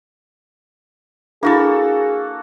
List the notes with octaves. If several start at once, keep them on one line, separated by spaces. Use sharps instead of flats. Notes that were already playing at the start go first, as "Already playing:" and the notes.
A#3 D4 E4 F#4 G#4 A4 B5